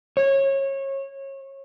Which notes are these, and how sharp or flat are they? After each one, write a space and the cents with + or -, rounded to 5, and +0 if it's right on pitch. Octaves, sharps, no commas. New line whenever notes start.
C#5 -25